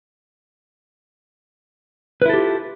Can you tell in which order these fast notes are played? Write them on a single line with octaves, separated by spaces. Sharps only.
B4 E4 A4 G4 F4